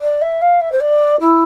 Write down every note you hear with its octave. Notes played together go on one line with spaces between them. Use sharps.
D5
E5
F5
E5
C5
D5
E4